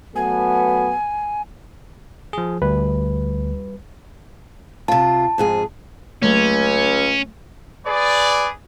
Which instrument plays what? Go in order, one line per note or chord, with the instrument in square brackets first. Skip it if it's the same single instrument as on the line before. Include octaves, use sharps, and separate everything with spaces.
[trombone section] F#3 A3 B3 [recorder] G#5
[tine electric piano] F3 G#4
[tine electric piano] D2 [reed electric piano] G3 B4
[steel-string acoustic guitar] C3 F4 [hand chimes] A5
[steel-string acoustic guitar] F2 G#2 G#4
[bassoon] C#2 [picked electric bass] F#3 A3 A#3 [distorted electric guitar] C#4
[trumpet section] G#4 B4 D5